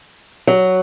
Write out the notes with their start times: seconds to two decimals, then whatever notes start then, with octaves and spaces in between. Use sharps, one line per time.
0.47 F#3